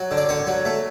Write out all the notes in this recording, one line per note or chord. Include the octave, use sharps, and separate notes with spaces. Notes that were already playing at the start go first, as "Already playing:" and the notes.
Already playing: F#3
D3
D5
D3 C#5
F#3
A3